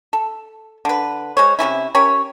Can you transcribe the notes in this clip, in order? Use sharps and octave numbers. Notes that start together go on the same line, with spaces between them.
A4
D3 B4
G#3 C5 C#5
C3 D#3 C#4 E4
C#4 G4 A#4 C#5